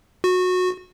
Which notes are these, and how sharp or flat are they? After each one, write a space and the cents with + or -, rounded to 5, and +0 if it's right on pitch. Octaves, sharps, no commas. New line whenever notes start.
F#4 -20